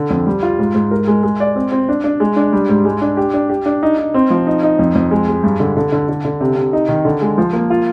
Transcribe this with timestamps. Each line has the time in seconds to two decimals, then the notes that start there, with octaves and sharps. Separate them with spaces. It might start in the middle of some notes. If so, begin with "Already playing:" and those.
Already playing: D3
0.10 F2
0.27 G3
0.43 F4
0.59 G#2
0.75 G#2
0.91 A#4
1.08 G#3
1.23 G#3
1.40 D5
1.56 C4
1.72 C4
1.89 D4
2.04 D4
2.20 G#3
2.36 D4
2.53 G3
2.69 G#2
2.85 G#3
3.02 D4
3.17 G4
3.34 D4
3.49 G4
3.66 D4
3.83 D#4
3.98 D#4
4.14 C4
4.30 F3
4.47 D#4
4.63 D#4
4.79 F2
4.95 F2
5.11 G#3
5.28 G#3
5.43 G2
5.60 D3
5.76 D3
5.92 D3
6.09 D3
6.25 D3
6.41 C3
6.56 C3
6.73 D#4
6.89 D#3
7.05 D3
7.21 G#3
7.38 F3
7.53 A#3
7.70 F4